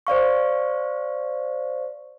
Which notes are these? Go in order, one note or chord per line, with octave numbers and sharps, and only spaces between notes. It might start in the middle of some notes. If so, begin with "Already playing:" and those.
C5 D5 F5 C#6